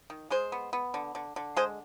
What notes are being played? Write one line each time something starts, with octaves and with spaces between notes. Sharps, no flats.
D#3
G#3 G#4 C5
B3
B3
D3
D3
D3
G#3 G#4 C5